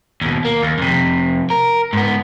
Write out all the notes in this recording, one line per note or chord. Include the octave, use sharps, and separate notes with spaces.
D#2 B2
A#3
D#2
F2 C3
A#4
G#2 B3